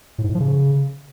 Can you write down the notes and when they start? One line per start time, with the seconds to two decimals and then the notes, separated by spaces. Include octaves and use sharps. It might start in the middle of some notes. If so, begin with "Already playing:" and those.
0.18 A2
0.24 G#2
0.29 A2
0.35 F3
0.40 C#3